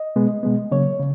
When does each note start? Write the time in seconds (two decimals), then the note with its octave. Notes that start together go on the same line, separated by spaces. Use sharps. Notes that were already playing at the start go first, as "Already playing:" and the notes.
Already playing: D#5
0.16 B2 G#3 B3
0.43 B2 G#3 B3
0.71 C#3 F#3 A#3 C#5
1.00 C#3